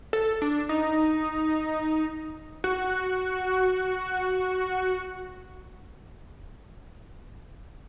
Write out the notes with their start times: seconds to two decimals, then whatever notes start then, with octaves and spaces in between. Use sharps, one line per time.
0.13 A4
0.42 D4
0.69 D#4
2.64 F#4